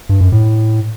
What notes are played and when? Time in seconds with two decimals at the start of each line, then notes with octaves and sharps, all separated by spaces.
0.09 G2
0.21 F#2
0.32 A2